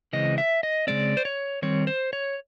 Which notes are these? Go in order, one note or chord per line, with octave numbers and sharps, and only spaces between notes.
C#3 E3 G#3 C4 D#5
E5
D#5
C#3 E3 G#3 C4 D5
C5
C#5
D#3 G3 C4 C#5
C5
C#5